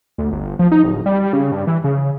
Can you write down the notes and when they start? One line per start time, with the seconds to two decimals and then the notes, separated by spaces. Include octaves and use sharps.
0.18 D2
0.32 G1
0.59 F3
0.72 D#4
0.84 D1
1.06 G3
1.33 C#3
1.52 G2
1.67 E3
1.84 C#3